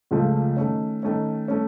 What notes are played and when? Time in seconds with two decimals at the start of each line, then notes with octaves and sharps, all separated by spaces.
0.11 C#2 C#3 F3 A3
0.57 D#3 A3 C#4
1.03 D#3 A3 C#4
1.48 A3 C#4